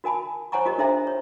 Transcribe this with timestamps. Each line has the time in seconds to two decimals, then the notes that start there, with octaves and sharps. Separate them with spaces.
0.04 F#4 A#4 G#5 A5 B5
0.52 C5 C#5 F#5 G#5 A#5 C#6
0.66 F4 G4 A#4 D#5
0.78 D4 A4 C5 D#5 E5 A#5
1.07 C#5